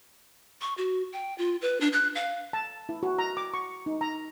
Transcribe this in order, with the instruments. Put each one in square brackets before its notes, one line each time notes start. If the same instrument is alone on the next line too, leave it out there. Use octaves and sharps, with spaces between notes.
[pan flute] C#6
F#4
G5
F4
B4
D4
F#6
F5
[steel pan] A5
E4
F#4
A#5
D6
C#6
D#4
A#5